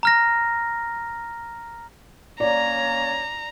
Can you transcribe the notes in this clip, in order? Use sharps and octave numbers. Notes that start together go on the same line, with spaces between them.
A#5 F6 A#6
A#3 C#4 C#5 D5 A#5